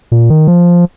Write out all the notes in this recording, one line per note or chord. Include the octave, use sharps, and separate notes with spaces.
A#2
D#3
F3